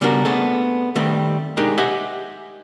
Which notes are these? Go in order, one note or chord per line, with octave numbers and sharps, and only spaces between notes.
C#3 G3 B3 D4 F#4 A#4
A3 B3 C4 D4 G#4 A4
D#3 G3 A3 C4
G#3 D4 D#4 G4 G#4 A#4
G4 C5 D#5 E5 F#5 G#5